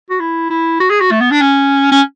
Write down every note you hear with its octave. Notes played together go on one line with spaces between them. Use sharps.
F#4
E4
E4
F#4
G#4
F#4
A3
B3
D4
C#4
C#4